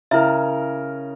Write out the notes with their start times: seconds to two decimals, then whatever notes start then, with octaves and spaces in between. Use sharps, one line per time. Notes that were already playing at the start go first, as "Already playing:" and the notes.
0.11 C#3 E4 A#4 E5